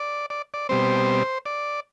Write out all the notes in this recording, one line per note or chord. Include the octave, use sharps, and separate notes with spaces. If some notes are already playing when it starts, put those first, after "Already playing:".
Already playing: D5
D5
D5
B2 G3 C4 C5
D5